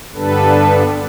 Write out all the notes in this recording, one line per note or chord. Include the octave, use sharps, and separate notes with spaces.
G2 D3 G3 B3 D4 A4 B4